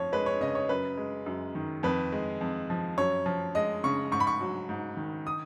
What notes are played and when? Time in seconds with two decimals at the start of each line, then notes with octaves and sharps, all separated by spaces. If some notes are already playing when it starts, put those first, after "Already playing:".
Already playing: F2 F3 C#5
0.12 G#3 B4
0.26 C#5
0.41 C#3 D#5
0.55 C#5
0.69 F#2 B4
0.97 G#3
1.26 F#2
1.55 D#3
1.83 F2 B4
2.12 G#3
2.41 F2
2.70 F3
2.98 F#2 C#5
3.26 F3
3.55 G#3 D#5
3.84 C#3 C#6
4.11 G#2 C#6
4.20 B5
4.27 C#6
4.41 F#3
4.69 G#2
4.97 D#3
5.27 D#6